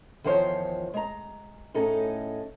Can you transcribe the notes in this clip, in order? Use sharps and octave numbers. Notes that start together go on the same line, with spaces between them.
E2 D#3 F3 C5 C#5
G#3 A#5
A2 C#4 D#4 G#4 A4